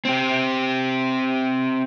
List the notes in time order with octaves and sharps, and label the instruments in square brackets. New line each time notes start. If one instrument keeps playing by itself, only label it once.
[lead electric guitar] C4 G4